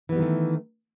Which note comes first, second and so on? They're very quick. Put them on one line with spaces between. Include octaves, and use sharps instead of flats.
E3 B3 G3 D#3 A3